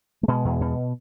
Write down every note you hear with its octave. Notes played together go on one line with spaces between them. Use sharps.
A3
B2 G#3
E2
B2